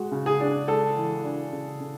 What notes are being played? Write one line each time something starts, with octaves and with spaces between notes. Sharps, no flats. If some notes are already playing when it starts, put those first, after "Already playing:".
Already playing: G#3 F#4
C#3
G#4
D4
G#3 A4
E3
D4
C#3
C#3